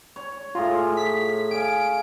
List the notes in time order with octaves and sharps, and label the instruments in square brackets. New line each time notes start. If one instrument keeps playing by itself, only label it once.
[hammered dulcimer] C#5
[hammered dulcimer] A2 G#4 A#5 [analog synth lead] F4
[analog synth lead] B6
[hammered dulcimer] F5 G#5 [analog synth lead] D7